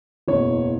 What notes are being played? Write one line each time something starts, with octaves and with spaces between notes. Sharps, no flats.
F#1 E2 B2 C#5